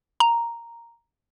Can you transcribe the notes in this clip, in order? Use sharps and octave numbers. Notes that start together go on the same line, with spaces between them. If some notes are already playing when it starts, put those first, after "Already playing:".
A#5